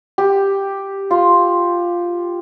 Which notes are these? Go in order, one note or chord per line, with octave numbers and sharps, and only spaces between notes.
G4
F4